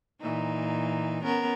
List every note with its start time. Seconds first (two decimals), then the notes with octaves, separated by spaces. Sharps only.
0.21 A#2 E3 D#4
1.24 B3 C#4 A#4